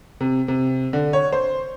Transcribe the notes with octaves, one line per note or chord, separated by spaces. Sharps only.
C3
C3
D3
C#5
C5